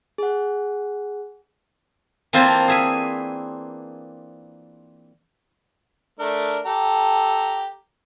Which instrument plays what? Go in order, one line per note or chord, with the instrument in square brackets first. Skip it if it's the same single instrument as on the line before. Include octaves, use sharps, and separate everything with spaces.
[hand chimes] G#4 F#5
[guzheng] E3 A#3 C4 D4 F4 C5
G#4 E5 G#5
[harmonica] A3 D4 A#4
G4 A4 A#5